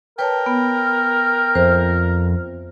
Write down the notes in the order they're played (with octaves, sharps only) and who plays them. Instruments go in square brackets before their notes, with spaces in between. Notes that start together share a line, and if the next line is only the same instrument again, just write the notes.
[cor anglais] A#4 [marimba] B4 C#5 A5 [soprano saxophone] G5
[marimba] B3
[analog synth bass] F2 [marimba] C5 E5